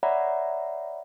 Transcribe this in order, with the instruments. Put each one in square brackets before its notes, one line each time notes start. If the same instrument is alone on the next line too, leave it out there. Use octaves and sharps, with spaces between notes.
[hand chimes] C#5 D5 E5 F#5 A#5 B5